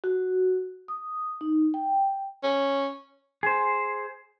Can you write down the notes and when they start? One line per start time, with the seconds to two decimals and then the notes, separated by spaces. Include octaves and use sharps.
0.04 F#4
0.88 D#6
1.41 D#4
1.74 G5
2.43 C#4
3.43 G#4 C5